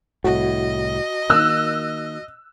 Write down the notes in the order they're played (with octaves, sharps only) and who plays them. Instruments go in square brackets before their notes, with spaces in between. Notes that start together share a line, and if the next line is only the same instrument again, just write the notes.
[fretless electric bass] C2 A2 [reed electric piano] F#4 [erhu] D#5
[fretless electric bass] D#3 A#3 [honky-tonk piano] E6 F#6